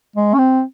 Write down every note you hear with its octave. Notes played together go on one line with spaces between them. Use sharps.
G#3
C#4
C4